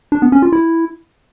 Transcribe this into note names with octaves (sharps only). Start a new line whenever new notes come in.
D4
B3
C#4
F4
E4